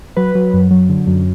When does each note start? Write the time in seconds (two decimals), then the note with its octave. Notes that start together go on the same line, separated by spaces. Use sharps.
0.16 F#3 B4
0.35 F#3
0.54 F#2
0.71 F#3
0.89 D3
1.07 F#2